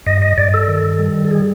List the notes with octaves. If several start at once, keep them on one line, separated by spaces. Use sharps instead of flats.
G2 D#5
D#5
G2 D5
A4
D#3
G3
A4
G#4